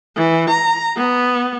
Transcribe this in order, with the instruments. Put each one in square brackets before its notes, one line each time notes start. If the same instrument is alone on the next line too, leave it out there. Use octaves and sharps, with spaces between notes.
[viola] E3
A#5
B3